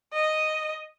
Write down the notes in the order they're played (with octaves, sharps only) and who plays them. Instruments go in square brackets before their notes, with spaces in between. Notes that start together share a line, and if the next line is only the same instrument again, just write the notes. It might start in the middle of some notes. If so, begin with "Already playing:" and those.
[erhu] D#5